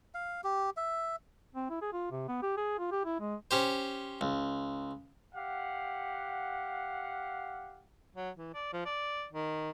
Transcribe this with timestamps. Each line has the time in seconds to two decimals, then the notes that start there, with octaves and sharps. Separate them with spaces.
0.14 F5
0.44 G4
0.77 E5
1.55 C4
1.70 E4
1.82 G#4
1.93 F4
2.11 C3
2.28 B3
2.42 G4
2.57 G#4
2.79 F4
2.92 G4
3.05 E4
3.20 G#3
3.51 C#4 G4 C5
4.21 C#2
5.35 G4 F5 F#5
8.15 F#3
8.37 E3
8.54 D5
8.73 F3
8.86 D5
9.32 D#3